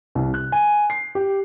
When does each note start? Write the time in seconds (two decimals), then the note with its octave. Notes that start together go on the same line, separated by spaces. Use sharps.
0.15 C2
0.34 F#6
0.52 G#5
0.90 C7
1.15 G4